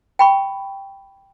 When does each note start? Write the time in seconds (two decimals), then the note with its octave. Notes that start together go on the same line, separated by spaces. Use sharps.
0.19 G5 B5 C#6